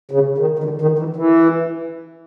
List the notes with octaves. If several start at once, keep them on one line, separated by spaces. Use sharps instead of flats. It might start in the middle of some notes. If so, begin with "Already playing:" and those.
C#3
D#3
D#3
D3
D#3
E3
E3